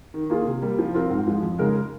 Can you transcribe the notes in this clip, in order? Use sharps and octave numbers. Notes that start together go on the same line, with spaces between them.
D#3
A#3 F4 G#4
C3
G3 A#3
F3
C4 F4 A#4
G#2
F3 G#3
F2
C#3 G#3 D#4 A#4